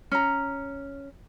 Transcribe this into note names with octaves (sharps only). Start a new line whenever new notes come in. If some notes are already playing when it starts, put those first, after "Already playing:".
C#4 A#5